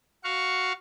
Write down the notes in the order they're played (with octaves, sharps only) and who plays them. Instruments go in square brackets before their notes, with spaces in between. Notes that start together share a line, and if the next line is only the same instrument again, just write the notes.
[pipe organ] F#4 F5 C#6